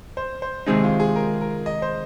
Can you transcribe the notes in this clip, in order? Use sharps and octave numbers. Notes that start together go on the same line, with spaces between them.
C5
C5
C3 D#3 G#3 C4 D#4 G#4
F4
G#4
A#4
A#4
D#5
C5